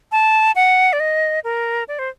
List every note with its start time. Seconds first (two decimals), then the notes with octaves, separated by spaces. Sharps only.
0.12 A5
0.56 F#5
0.93 D5
1.00 D#5
1.44 A#4
1.88 D5
1.99 C5